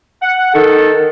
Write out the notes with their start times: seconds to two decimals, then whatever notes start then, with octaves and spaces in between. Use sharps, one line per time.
0.21 F#5
0.54 D#3 A4